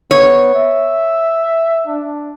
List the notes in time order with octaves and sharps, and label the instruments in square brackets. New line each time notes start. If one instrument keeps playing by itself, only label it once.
[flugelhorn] B3 [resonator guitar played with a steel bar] C#5
[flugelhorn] E5
D4